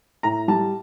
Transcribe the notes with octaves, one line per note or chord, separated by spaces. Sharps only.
A2 A#5
G3 A5